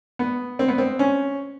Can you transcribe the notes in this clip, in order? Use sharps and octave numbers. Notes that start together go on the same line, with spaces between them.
B3
C4
B3
C4
C#4